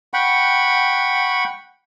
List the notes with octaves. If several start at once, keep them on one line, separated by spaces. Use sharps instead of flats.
F#5 G5 B5 C#6